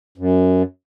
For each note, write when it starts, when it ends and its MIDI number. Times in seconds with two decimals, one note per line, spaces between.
0.18 0.63 42